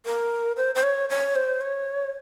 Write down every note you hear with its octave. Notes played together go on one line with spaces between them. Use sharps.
A#4
C5
C5
C#5
C#5
C5
C#5